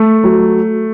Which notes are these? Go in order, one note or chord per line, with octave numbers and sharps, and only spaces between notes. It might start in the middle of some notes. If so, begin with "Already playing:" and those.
Already playing: A3
F#3